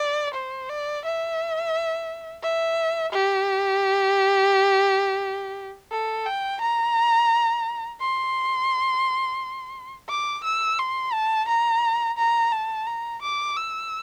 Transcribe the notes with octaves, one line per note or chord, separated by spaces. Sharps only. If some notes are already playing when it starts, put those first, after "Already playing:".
Already playing: D5
C5
D5
E5
E5
G4
A4
G5
A#5
C6
D6
E6
C6
A5
A#5
A#5
A5
A#5
D6
E6